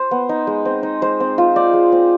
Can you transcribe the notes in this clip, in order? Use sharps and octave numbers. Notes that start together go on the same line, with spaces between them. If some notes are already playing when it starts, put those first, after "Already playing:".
Already playing: C5
B3
D#4
G#3
C4
D#4
G#3 C5
C4
F4
D#4 D5
G#3
C4